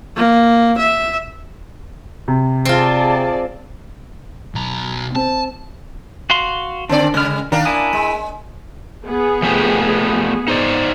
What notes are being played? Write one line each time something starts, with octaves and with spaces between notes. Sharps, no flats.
A#3
E5
C3
C4 F4 G#4 D5 A5
B1 A#5
C4 A5
F#4 F5 C6
D3 C4 D4 D5
C#3 G#3 F6
D#3 A#3 D4 A#4
E4 G#5 D#6
G#3
B3 G#4
F3 A3 G4
D#4 C5 D5